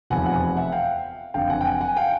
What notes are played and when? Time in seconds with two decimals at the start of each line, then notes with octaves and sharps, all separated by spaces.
0.10 F1 E2 C3 F3 F#5 G#5
0.26 F#5 G#5
0.57 E5 F#5
0.72 F5 G5
1.34 F#1 F2 D3 F5 G5
1.50 F#5 G#5
1.61 G5
1.65 F#5 G#5
1.81 F#5 G#5
1.96 F5 G5